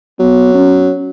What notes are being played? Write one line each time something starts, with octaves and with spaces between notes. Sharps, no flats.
F#3 B3
C#4